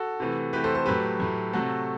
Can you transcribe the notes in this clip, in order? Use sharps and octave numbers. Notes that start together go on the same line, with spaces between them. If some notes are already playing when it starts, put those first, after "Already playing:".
Already playing: F#4 A4
C3 E3 A3
C3 E3 A3 G4 B4
A4 C5
A4 C5
A2 F#3 A3 G4 B4
A2 F#3 A3
C3 F#3 A3 F#4 A4